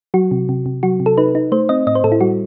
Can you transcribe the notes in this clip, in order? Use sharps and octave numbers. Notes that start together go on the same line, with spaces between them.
F#3 F#4
C3
C3
C3
F#3 F#4
C3
A4
D#4 B4
D#4
A3 C5
C4 D#5
A2 D#5
C5
A2 A4
E4
G3 F#4